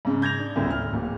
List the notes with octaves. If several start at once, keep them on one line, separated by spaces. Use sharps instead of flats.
G#2 C#3
G6 G#6 A#6 F7
D4
G1 D2 A2 C#3
F6
D1 D#2